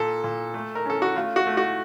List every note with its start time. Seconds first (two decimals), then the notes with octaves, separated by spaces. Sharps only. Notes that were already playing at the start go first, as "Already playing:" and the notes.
Already playing: A#2 A4
0.24 A#2
0.54 A3
0.75 A#4
0.86 C#4 A4
1.02 F#4
1.15 A3 F4
1.36 F#4
1.47 A3
1.57 F#4